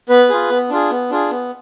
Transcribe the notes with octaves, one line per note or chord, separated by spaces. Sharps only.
B3 B4
F4 G#4
B3
D4 F4 G#4
B3
D4 F4 G#4
B3